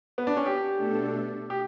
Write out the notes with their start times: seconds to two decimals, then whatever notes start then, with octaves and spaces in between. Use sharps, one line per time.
0.18 B3
0.27 D4
0.37 C#4
0.46 G4
0.74 B2 A3 D4 A4
1.50 G4